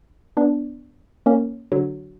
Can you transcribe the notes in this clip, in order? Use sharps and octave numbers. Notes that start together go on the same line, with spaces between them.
B3 D4
A#3 C#4
D3 F#3